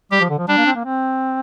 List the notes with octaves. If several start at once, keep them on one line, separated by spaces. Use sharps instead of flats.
G3 G4
F3
D3
F3
G3 D4
A#3
C4
A#3
C4